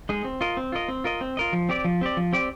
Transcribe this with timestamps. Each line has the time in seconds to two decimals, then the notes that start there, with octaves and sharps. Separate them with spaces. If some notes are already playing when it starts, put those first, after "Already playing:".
0.09 G#3 D#4 G#4
0.25 C4
0.41 F4 A#4 D#5
0.57 C4
0.72 F4 A#4 D#5
0.88 C4
1.04 F4 A#4 D#5
1.21 C4
1.37 F4 A#4 D#5
1.53 F3
1.69 C4 G4 D5
1.84 F3
2.01 C4 G4 D5
2.17 F3
2.33 C4 G4 D5